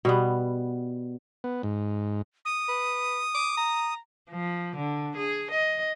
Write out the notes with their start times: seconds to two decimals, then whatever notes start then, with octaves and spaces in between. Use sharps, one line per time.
0.05 B2 G3 B3
1.44 B3
1.63 G#2
2.45 D#6
2.69 B4
3.35 D6
3.57 A#5
4.30 F3
4.76 D3
5.16 G#4
5.51 D#5